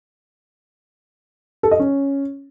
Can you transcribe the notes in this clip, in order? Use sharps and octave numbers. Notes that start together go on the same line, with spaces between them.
A4
D#5
C#4